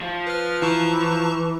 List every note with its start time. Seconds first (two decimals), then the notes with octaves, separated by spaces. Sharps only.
0.01 F3 F4
0.27 B4 F6
0.62 E3 A5 A#5 C#6